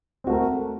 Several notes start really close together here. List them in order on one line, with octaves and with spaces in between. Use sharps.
C4 F#4 A3 A#4